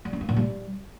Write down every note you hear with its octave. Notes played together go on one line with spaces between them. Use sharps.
G3
C#4
A#3
A#2
G3